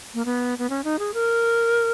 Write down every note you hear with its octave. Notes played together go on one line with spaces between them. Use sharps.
A#3
B3
B3
C#4
D#4
G#4
A#4